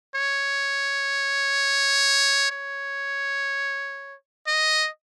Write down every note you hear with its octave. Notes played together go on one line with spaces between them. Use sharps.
C#5
C#5
D#5